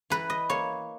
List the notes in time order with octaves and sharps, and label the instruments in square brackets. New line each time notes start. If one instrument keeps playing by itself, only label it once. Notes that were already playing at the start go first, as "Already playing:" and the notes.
[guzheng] E3 B4
D#5
A#3 C#5